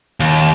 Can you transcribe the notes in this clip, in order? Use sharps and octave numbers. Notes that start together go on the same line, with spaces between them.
D#2